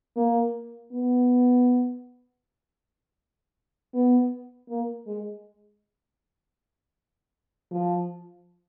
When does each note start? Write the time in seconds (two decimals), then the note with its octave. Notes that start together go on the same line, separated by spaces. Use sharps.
0.16 A#3
0.92 B3
3.94 B3
4.69 A#3
5.07 G#3
7.71 F3